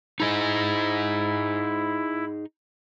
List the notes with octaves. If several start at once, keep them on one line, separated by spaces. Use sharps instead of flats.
D#4 E4 G#4 D#5